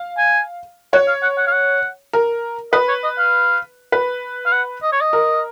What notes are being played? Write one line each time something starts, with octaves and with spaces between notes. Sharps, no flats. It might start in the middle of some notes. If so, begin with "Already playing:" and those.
Already playing: F5
G#5
C#5 F#5
F5
F#5
F#5
F5
F#5
A#4
B4 D#5
C#5
D#5
F5
B4
F5
F#5
D#5
C#5
D#5
A#4